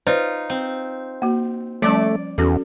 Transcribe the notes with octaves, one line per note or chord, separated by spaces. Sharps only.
D#4 F4 B4 C5 D5
C4
A#3 F#4
F3 G3 A3 C#4 D5
E2 C#4 F#4 A4